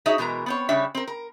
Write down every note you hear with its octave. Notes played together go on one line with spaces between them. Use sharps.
D#4 F#4 G#4 C#5 D#5 E5
B2 E3 G#3 A#4 A#5
B3 C4 C#5
C#3 G3 D4 C#5 E5
C4 A#4
A#4